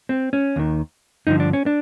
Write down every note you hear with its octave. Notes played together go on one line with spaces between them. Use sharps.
C4
C#4
D#2 D#3
G2 D3 F3 D#4
D4
C#4
D4